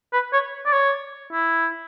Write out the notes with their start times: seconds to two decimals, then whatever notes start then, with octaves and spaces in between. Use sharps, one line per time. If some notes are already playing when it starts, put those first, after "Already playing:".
0.13 B4
0.33 C#5
0.65 D5
0.72 C#5
1.32 E4